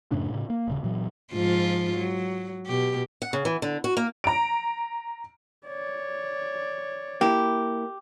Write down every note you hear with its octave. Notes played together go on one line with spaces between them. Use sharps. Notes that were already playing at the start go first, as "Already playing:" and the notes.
F#2 A2 C#3 D4
A2 C#3
A#3
D#1 C#3
A#2 E3 F#3
G#2 F3 F4
F#3
B2 G4
F#5
C#3
E3
D3
F#4
A#3
A#5 D7
C#5 D5
A#3 E4 G4